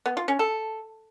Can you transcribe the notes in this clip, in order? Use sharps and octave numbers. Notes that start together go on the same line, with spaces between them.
B3
F4
C#4
A4